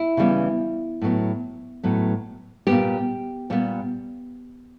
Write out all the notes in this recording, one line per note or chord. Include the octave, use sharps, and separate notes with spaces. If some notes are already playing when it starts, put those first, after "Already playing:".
Already playing: E4
C#3 E3 G3 B3
A2 F#3 B3
A2 F#3 B3
A#2 G3 B3 G4
A#2 G3 B3